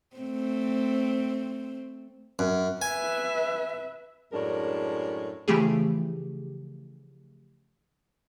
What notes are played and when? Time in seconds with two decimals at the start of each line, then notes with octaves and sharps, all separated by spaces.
0.16 A3 C4
2.39 F#2
2.82 B4 E5 G#5
4.33 F#2 A2 G#3 D4 A#4 C#5
5.48 C#3 E3 F3 A3 G4 G#4